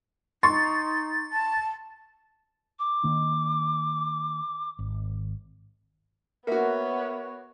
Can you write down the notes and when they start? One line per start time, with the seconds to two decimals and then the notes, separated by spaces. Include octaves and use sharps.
0.43 D#4 C6 C#6 A6
1.32 A5
2.79 D6
3.04 D#3 A#3 D4
4.79 G#1
6.47 A#3 B3 F#4 A#4 C#5 E5